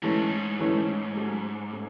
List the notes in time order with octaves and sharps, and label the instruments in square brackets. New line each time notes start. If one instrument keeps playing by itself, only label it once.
[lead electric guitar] G#2 [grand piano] E3 A3 C#4
[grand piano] E3 A3 C#4
F#3 A3 C#4
A3 C#4